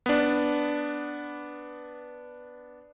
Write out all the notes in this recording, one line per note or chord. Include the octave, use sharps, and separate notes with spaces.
B3 D4